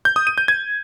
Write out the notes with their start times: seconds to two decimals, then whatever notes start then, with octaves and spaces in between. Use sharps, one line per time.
0.05 G6
0.16 D#6
0.27 D#7
0.38 G6
0.48 G#6